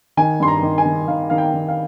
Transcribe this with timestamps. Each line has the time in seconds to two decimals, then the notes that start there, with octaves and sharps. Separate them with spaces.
0.17 D#3 G#5
0.40 G2 C6
0.48 A#5
0.63 D#3
0.78 G#5
0.85 D#3
1.08 D#3 F5
1.30 D#3 F5
1.38 G5
1.54 D#3
1.68 F5